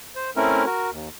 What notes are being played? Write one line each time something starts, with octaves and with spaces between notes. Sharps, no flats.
C5
A3 C4 C#4 E4 A#4
F#4 A#4
D#2